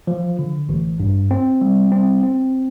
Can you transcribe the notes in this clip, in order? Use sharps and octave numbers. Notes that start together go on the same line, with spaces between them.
F3
D3
A1
G2
C4
G3
C4
C4